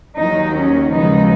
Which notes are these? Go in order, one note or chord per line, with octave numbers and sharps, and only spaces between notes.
D#2 D#3 F#3 D#4
C#4
D#2 C#3 F3 G#3 B3 D#4